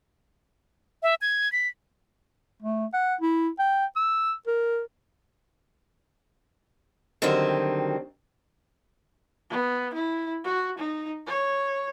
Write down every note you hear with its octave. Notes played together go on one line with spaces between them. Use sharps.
E5
G#6
B6
A3
F#5
E4
G5
E6
A#4
D3 D#3 F#3 G3 C4
B3
E4
F#4
D#4
C#5